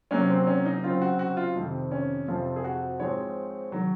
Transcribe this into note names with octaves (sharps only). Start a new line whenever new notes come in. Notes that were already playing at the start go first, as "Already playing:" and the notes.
C3 F#3 A#3 C#4
C4
C#4
D#4
C#3 F#3 C4 F4
F#4
F#4
F4
F2 C3 D#3
C#4
F2 C3 F3 F4
G#4
F#4
G#2 F3 G#3 C4 C#5
D#3 F#3